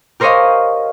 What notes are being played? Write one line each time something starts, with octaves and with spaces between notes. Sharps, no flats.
G4 A#4 C5 C#5 D#5 F5